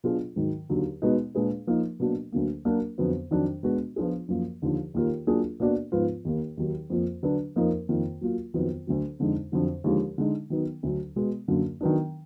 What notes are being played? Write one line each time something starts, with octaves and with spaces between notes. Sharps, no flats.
B2 F#3 D4 F4 G#4
G#2 D#3 F#3
D#2 D3 F#3
B2 G#3 B3 D#4
A#2 G#3 D4 G#4 B4
F3 A#3 D#4
B2 F#3 A#3 D4 F#4
D2 D3 F#3 A#3
F#3 A#3 D4 F#4 A#4
F2 D3 F#3 B3
F2 D#3 F#3 D4
B2 G#3 B3 D4 F#4
F3 B3 D4 F4 G#4
F#2 F3 A#3
D#2 D3 F3
D#2 D#3 A#3 F4 A#4
F#3 A#3 D4 F4 G#4
B2 A#3 D4 F#4 D5
G#2 F3 B3 F4 B4
D#2 D#3 A#3
D#2 D#3 F#3
F2 F3 A#3 F4
D3 F#3 D4 F#4 B4
F2 F3 A#3 D#4 A#4
F2 D#3 A#3 F4
F#3 A#3 F4
F2 D#3 F#3 B3 F4
D2 D3 F#3
F2 D3 G#3 D#4
F2 D3 F#3
D#2 D3 F3 G#3
D3 G#3 D#4
D#3 F#3 B3 D#4
D2 D3 F#3
B2 G#3 B3
F#2 D3 F#3 A#3
D#3 F#3 B3 D4